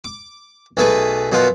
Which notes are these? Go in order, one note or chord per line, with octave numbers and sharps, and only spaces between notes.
D6
B1 A3 G#4 B4 D6
F#2 B2 B3 F4